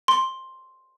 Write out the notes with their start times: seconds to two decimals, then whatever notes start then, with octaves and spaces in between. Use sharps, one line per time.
0.08 C6